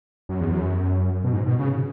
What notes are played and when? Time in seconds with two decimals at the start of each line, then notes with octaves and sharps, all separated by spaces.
0.29 F#2
0.40 E2
0.53 F#2
1.24 B2
1.33 G#2
1.46 B2
1.59 C#3